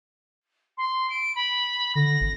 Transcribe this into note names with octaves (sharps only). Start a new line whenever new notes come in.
C6
D7
B5
D3 A#6
G#1